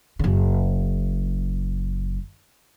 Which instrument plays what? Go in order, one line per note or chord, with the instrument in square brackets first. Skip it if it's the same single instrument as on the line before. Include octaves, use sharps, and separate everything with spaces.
[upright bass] F#1 C#3